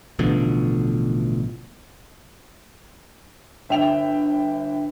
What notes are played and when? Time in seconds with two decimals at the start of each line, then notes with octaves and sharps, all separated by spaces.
0.19 A1 B2 D3 F3
3.69 G1 E5 G5 F7